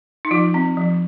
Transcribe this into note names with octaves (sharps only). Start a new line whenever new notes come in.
D#4
F3 F4
C4
F3